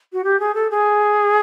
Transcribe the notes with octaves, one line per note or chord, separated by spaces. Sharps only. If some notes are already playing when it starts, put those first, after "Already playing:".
F#4
G4
G#4
A4
G#4